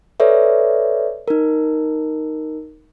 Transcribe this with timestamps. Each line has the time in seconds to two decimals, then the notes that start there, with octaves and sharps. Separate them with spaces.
0.20 A4 B4 C#5 D5 E5
1.28 D#4 A#4